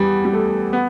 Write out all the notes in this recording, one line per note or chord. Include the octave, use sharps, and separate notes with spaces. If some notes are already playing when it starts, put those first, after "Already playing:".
Already playing: E2 G3
G3
A3
B3